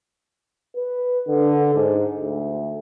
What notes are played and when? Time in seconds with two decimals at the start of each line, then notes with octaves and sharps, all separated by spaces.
0.76 B4
1.28 D3
1.75 G#2
2.21 D2